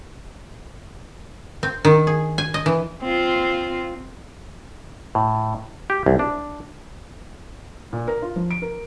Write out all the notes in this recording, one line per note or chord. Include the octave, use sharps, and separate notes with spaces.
C4
D#3
G#4
G#5
D#5
E3
C4 F4
A2
G4
C2
D4
A#2
A#4
F4
F3
D7
A#4